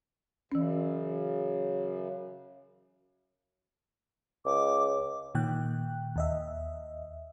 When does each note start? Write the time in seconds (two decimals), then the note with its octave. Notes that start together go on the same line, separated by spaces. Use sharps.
0.52 F#2 C#3 E3 C#4
4.46 C#2 D6
5.35 A#2 D#3 G5 F#6
6.16 D#2 D#5 E5